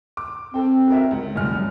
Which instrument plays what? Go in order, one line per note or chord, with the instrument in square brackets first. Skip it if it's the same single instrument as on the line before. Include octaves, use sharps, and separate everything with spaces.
[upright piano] D6
[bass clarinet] C4 [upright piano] A4 G5
[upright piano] F#4 A#4 E5
C#2
[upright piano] F1 A#1 F6 [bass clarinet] G3
[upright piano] F#2